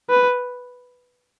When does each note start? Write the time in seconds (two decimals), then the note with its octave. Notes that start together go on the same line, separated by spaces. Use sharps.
0.10 B4